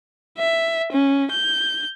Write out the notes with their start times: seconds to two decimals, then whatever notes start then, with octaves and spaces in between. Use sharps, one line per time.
0.38 E5
0.92 C#4
1.31 G6